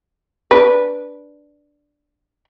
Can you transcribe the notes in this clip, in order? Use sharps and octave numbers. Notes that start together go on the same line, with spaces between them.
D4 B4